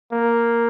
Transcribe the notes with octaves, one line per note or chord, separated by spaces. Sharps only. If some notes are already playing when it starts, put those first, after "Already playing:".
A#3